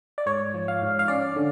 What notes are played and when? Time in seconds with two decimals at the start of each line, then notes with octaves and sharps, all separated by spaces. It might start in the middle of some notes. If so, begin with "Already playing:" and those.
0.18 D5
0.26 G#2 C#5
0.54 F3
0.68 F5
0.82 G#2
0.99 F5
1.08 C#4 D5
1.36 D3